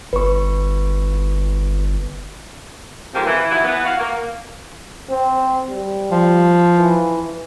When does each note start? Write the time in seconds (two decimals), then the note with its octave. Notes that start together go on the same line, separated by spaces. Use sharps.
0.13 G1 B4 C#6
3.13 F2 G#2 D#3 A#3 C4 G4
3.25 E3
3.50 D#2 E3 F#3 E4
3.64 E3 B3
3.85 F#4 F5
3.99 A#3
5.09 C4
5.69 G3
6.11 F3
6.77 E3